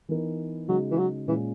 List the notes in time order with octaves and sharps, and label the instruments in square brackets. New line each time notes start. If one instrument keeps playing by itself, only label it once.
[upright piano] E3 B3 D#4 A#4
[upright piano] C#3 G#3 D#4 F#4 [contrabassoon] F#3
[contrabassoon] E3
F#3
[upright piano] A#2 G#3 C#4 [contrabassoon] E3